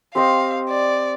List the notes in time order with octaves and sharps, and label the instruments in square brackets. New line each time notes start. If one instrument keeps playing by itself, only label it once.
[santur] C4 G4 C5 D#5 [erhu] F5
[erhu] D5